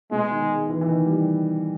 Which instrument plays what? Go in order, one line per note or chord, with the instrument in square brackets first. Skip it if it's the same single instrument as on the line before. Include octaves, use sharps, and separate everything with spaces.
[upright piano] B2 [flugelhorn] G#3
[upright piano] D#3
E3
E3
D#3
G3